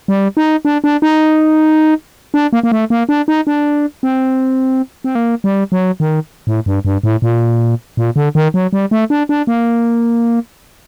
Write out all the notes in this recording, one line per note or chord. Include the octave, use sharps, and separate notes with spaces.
G3
D#4
D4
D4
D#4
D4
A#3
A#3
A3
A#3
D4
D#4
D4
C4
C4
A#3
G3
F#3
D#3
A2
G2
G2
A2
A#2
A#2
D3
D#3
F#3
G3
A3
D4
D4
A#3